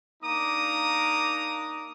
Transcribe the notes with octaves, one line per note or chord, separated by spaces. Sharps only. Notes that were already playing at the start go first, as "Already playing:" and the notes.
A#3 D4 D#4 A#5 D6 D#6